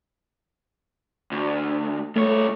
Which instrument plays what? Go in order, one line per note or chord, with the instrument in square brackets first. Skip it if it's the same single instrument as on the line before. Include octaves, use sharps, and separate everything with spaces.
[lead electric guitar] D2
[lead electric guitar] C2 C#5 [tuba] A3